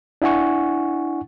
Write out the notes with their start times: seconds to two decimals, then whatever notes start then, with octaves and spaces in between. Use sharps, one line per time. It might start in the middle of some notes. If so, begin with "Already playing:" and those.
0.22 D4 E4 F#5 G#5 C#6